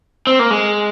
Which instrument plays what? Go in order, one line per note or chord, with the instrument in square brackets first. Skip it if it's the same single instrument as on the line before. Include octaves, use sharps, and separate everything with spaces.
[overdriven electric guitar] C4
A#3
G#3